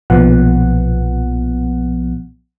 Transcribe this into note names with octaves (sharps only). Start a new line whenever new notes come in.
B1 A#2 F3 B3 F#5